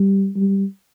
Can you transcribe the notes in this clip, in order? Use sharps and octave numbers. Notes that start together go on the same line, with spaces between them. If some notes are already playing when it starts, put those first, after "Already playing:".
Already playing: G3
G3